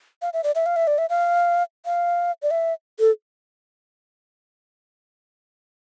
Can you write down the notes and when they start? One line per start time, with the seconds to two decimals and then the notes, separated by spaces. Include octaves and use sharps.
0.22 F5
0.33 E5
0.44 D5
0.55 E5
0.66 F5
0.76 E5
0.87 D5
0.98 E5
1.10 F5
1.86 F5
2.43 D5
2.51 E5
2.99 A4